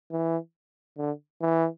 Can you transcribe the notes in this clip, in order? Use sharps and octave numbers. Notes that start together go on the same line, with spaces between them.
E3
D3
E3